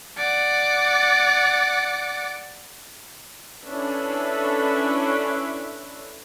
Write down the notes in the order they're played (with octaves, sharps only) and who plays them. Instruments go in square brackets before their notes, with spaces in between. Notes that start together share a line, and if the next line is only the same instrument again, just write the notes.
[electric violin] D5 F#5
[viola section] C#4 D4 E4 A4 B4 E5